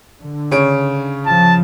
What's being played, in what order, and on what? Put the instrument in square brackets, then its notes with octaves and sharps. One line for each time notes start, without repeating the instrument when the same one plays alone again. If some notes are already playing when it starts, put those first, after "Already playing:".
[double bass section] D3
[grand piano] C#3 C#5 D7
[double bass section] F3 [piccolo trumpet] A5